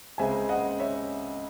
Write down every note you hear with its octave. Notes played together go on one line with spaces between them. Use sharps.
C#2 C#3 G#3 C4 E5 G#5
D#5 F#5
C#5 E5